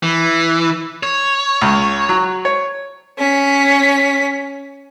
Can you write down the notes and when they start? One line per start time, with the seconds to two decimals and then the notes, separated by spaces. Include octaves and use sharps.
0.03 E3
1.03 C#5
1.62 C#2
2.09 F#3
2.45 C#5
3.18 C#4 B6